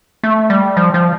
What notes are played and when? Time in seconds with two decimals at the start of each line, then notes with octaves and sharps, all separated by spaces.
0.24 A3
0.50 G3
0.77 F3
0.94 F3